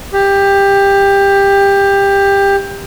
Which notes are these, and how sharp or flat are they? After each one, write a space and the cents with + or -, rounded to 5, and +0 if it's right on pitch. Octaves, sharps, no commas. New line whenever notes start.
G4 +15